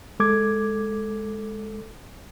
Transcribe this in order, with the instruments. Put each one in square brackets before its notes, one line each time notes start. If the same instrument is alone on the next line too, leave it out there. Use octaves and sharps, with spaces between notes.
[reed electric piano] G#3 A4 D6 G#6